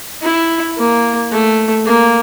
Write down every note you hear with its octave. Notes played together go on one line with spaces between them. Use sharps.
E4
A#3
A3
A#3